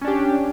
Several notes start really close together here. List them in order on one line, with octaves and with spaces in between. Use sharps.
C#4 D4 G4